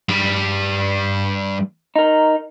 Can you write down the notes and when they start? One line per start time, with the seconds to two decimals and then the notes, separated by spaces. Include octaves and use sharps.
0.09 G2 G3
1.96 D#4 A#4